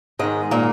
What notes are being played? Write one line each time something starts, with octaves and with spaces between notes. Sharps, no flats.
G#2 D#3 G#3
A#2 A#3